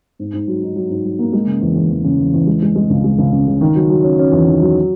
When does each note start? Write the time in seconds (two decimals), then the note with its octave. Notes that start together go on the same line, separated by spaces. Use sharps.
0.19 G#2
0.33 G#2
0.48 F#3
0.63 D#4
0.76 F#3
0.90 G#2
1.05 F#3
1.19 A#3
1.33 G#3
1.47 C#3
1.62 E2
1.76 E2
1.90 E2
2.04 C#3
2.18 E2
2.34 E2
2.47 G#3
2.62 G#3
2.75 G#3
2.90 C#2
3.04 G#3
3.19 C#2
3.32 C#3
3.47 C#3
3.61 D#3
3.75 F#3
3.90 F#3
4.03 C#4
4.19 C#4
4.32 E2
4.47 D#3
4.61 F#3